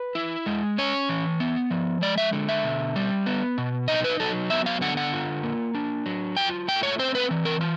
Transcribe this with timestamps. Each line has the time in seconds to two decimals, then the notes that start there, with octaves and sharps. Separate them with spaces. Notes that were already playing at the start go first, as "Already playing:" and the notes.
Already playing: B4
0.15 E4
0.46 G#3
0.78 C#4 C#5
1.09 E3
1.40 B3
1.70 F3
2.01 G#3 D5
2.18 E5
2.33 D3
2.49 E5
2.64 B2
2.96 G3
3.26 B3
3.58 B2
3.88 D#4 D#5
4.04 B4
4.20 F#3 A4
4.50 B3 E5
4.66 F5
4.81 D3 F#5
4.97 F#5
5.13 F4
5.43 A#3
5.75 D4
6.06 F#3
6.37 F4 G5
6.68 A3 G5
6.83 C#5
6.99 C4 C5
7.15 B4
7.31 E3
7.45 A#4
7.61 F4